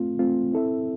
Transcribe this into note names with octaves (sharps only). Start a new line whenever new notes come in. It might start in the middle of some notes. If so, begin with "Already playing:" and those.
Already playing: A3 C4 F4
A3 C4 F4
C4 E4 A4 E5